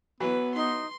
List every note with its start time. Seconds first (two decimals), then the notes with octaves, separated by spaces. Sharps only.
0.20 E3 F#3 B3 B4
0.54 D#4 C6